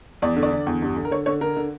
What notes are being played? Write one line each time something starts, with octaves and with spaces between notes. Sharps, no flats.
E2 D5
D3
D5
D3
E2
G2
D3
A#4
D3 C#5
D3 C#5
D3 A#4
D3